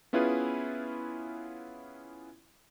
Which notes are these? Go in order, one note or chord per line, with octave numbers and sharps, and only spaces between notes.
B3 C#4 E4 F4 G#4 B4